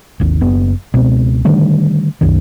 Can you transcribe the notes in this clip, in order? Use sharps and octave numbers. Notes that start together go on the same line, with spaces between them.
G#1 D#2
F#1 B3
C#2 B2 G#3 C4
D3 D#3 G3 A3
C2 F#2 D#3